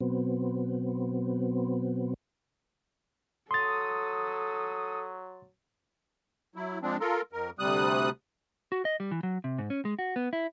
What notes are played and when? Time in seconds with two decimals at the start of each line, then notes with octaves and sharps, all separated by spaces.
0.01 B2 F#3 B3 C4
3.51 F#3 A4 C6 D#6 A6
6.56 F#3 E4
6.82 F3 G#3 C4 D4
7.00 F4 A4 A#4
7.33 F2 A#4
7.59 D2 C3 G3 D#6 F#6
8.72 F#4
8.85 D#5
9.00 G3
9.11 E3
9.23 F#3
9.44 C3
9.59 G#2
9.70 C#4
9.85 G#3
9.99 F#4
10.16 B3
10.33 E4